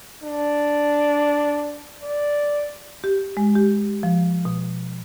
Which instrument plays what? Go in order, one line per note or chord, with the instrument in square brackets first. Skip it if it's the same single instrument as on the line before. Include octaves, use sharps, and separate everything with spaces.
[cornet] D4
D5
[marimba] G4
G#3
G4
F3
B2